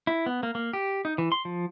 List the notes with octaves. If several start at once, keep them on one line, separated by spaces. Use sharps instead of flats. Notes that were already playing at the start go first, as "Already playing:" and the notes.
E4
B3
A#3
A#3
G4
D#4
E3
C6
F3